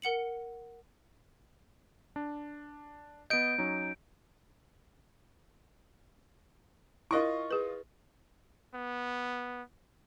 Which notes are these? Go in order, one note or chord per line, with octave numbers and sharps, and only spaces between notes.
A#4 F#5 C#7 F#7
D4
B3 D#5 G6 D7
F#3 C#4 D#4
E4 F4 A#4 D#5 C#6
G#4 B4
B3